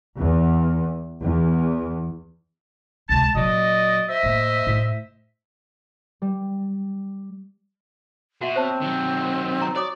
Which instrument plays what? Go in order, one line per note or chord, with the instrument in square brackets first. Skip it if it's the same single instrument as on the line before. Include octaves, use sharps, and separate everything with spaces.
[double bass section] E2
E2
[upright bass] C#2 C3 [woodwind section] A5
[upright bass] A#2 F#3 [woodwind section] F#4 D5 D#5
[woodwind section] C5 D#5 E5
[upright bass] A2 A#3
A2
[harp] G3
[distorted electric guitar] B2 [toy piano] F#4 E5 F#5
[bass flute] C4 [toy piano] C5 C#5 A5
[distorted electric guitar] D#3 F#3
[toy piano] A#5 C#6
[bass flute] F#4 [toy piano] C#5 D6 D#6 [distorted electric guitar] D5